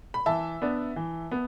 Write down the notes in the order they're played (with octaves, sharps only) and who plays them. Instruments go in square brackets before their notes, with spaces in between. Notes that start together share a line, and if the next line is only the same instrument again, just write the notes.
[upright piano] B5
E3 E5 A5
B3 D4
E3
B3